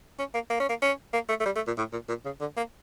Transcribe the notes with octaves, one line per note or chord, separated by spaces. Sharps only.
C#4
A#3
A#3
C#4
A#3
C#4
A#3
A3
A3
G3
A3
A#2
A2
A#2
A#2
C#3
D3
A#3